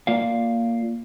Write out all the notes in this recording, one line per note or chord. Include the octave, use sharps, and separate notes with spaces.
A#3 F4 D5 F5